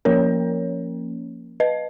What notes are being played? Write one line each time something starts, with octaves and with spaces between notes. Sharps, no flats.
F3 A#3 C#4 A#4 C#5
B4 D#5